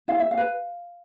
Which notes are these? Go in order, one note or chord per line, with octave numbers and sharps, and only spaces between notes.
E4 F5
E5
F5
B4